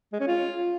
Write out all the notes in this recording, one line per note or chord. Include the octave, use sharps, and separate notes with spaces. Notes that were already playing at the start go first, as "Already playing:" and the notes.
G#3
C#4
F4